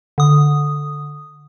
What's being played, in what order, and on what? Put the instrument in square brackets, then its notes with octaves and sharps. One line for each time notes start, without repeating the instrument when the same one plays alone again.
[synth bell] D3 D#6